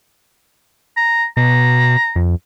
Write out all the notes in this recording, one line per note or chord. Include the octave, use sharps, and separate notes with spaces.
A#5
B2 A#5
F2